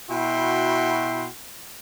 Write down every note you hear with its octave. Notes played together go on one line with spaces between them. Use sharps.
B2 E4 F#4 E5 G5 C6